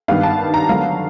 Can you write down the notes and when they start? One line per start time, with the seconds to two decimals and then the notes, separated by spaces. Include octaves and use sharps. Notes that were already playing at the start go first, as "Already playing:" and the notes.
0.08 G2 D#3 G3 B3 F5
0.23 A5
0.54 A#5
0.69 D3 F#3 B3 F5